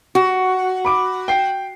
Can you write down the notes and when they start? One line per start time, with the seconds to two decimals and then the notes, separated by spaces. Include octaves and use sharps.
0.15 F#4
0.85 B5 D6 D7
1.28 G5 C7